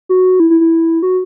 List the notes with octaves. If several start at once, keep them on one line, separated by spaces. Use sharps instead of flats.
F#4
E4
E4
E4
F#4